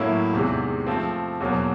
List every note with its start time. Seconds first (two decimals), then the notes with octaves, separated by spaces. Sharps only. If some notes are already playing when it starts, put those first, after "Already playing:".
Already playing: A2 F#3 A#3 C#4 E4
0.33 E2 C3 D#3 G#3
0.87 F3 A3 C4
1.40 E2 B2 F#3 A#3